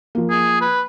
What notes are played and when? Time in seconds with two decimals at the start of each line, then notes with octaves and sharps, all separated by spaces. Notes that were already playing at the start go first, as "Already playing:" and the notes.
0.15 F3 A#3
0.30 G#4
0.61 B4